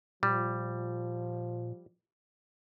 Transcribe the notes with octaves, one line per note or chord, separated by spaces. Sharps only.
A#2 F3 G3